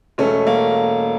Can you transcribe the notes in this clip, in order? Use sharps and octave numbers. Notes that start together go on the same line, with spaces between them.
E1 A3 C#4
A#3